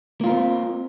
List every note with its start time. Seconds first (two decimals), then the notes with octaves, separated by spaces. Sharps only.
0.21 A#3
0.24 F4
0.26 A#4
0.29 C4